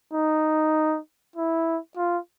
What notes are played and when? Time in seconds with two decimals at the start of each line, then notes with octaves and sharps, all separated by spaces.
0.13 D#4
1.36 E4
1.97 F4